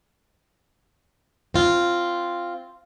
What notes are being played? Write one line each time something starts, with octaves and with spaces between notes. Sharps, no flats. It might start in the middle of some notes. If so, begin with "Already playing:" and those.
C4 F4